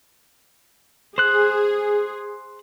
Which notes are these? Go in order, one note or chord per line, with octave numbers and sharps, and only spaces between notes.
G#4 C5 F#6